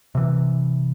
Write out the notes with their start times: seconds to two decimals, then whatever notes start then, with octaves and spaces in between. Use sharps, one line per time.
0.15 C3 E3